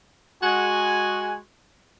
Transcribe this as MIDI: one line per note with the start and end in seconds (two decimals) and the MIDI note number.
0.42 1.37 56
0.42 1.37 66
0.42 1.37 80